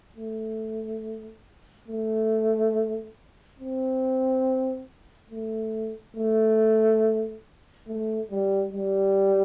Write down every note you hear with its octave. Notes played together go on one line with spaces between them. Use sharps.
A3
A3
C4
A3
A3
A3
G3
G3